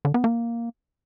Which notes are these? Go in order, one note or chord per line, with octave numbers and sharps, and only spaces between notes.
D3
B3
A#3